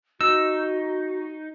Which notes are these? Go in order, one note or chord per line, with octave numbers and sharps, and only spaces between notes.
D#4 F#4 E6